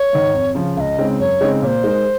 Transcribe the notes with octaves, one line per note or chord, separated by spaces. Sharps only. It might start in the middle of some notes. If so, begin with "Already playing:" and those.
Already playing: C#5
G#2 D#3
F2
C#3 F3
C#2 D#5 F5
C#3 G#3 C4 D#4
F#2 C#5
C#3 G#3 C4 D#4
A#2 C5 C#5
G#3 D#4 A#4